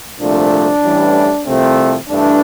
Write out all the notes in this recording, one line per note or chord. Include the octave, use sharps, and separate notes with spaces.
C2 A#2 F3 A3 D4
A1 A2 E3 G3
C2 C3 F3 A3 C4
G2 E3 A3 D4